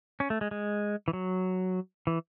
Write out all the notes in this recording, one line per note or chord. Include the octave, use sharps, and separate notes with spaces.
C#4
A3
G#3
G#3
E3
F#3
E3